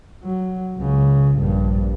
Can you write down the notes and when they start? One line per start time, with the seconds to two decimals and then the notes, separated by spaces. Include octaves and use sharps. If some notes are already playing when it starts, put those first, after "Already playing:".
0.24 F#3
0.77 C#2 C#3
1.37 A#1 G2